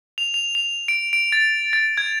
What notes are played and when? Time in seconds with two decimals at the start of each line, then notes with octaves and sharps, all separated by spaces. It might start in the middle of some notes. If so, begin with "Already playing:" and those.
0.18 F7
0.34 F7
0.55 F7
0.88 D7
1.13 D7
1.32 A6
1.73 A6
1.98 G#6